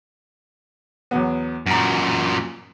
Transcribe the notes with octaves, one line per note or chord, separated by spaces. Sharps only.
E2 F#3 B3
F#2 A#2 A#5 D7